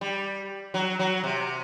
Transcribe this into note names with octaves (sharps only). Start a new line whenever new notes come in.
G3
F#3
F#3
C3